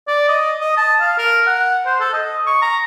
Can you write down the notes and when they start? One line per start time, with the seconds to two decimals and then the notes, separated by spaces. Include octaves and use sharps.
0.07 D5
0.28 D#5
0.61 D#5
0.77 A5
1.01 F5
1.18 A#4
1.47 F#5
1.86 C5
2.00 A4
2.13 D#5
2.47 C#6
2.62 A#5